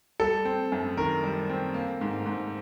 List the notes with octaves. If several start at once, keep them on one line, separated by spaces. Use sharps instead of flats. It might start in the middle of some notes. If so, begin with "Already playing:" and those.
G3 A4
C4
F#2
D#3 A#4
G3
C4
A#3
G#2
G#2